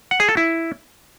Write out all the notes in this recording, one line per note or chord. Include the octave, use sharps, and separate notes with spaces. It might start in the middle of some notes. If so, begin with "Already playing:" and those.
F#5
G#4
A4
E4